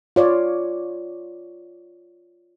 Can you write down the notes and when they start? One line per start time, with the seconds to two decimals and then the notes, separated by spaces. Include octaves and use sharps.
0.16 F4 C#5 D5